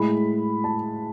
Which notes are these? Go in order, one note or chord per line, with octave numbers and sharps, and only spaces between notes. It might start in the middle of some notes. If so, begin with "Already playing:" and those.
Already playing: A2 G#3 B5
A5